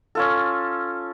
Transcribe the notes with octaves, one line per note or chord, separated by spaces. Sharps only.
C#4 F4 A4